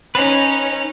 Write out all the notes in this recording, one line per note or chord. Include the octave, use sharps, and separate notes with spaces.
C#4 D#4 B4 F7